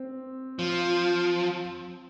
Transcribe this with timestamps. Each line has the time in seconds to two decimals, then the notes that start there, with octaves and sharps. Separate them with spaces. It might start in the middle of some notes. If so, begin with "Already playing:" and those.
Already playing: C4
0.59 F3